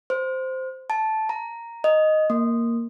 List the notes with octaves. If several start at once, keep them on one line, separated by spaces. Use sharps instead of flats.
C5
A5
A#5
D#5
A#3